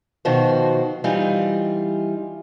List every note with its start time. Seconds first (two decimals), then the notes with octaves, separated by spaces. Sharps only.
0.25 B2 D#3 F3 F#4 C5
1.04 E3 G3 D#4 F4